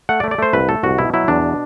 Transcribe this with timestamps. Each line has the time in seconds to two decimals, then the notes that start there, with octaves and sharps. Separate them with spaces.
0.09 A3 F#5
0.20 D5
0.24 A3
0.31 D5
0.38 A3 C5
0.53 C2 B4
0.69 A3 A4
0.83 C2 F#4
0.98 B2 E4
1.14 F#3 E4
1.28 E2 D4
1.44 B2